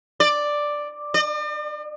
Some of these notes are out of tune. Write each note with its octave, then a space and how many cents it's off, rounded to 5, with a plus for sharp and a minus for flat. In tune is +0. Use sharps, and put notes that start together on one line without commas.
D5 +5
D5 +45